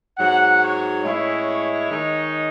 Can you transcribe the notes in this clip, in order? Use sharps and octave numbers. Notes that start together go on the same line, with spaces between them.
G#2 F#3 B3 F#5
C#5
A2 G#3 C#4 E4
D#3 G#3 D#4